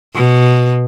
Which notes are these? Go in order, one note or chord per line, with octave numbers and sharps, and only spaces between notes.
B2